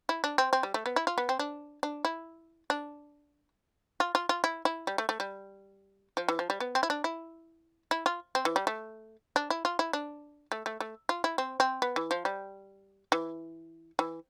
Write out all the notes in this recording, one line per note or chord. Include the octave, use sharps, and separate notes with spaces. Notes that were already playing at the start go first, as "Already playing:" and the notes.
E4
D4
C4
C4
G3
A3
B3
E4
F4
B3
C4
D4
D4
E4
D4
F4
F4
F4
E4
E4
G3
A3
A3
G3
F3
E3
F3
G3
B3
C4
E4
D4
E4
E4
F4
C4
E3
G3
A3
D4
E4
F4
E4
D4
A3
A3
A3
F4
E4
C4
C4
B3
E3
F3
G3
E3
E3